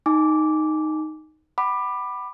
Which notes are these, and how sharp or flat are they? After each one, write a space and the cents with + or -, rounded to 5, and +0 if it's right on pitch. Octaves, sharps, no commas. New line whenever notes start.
D#4 +0 G#5 +0 D6 -10
F#5 +30 B5 +0 D6 +20